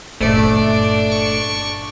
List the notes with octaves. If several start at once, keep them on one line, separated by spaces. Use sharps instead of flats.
G1 A#2 A3 D4 D5
C#6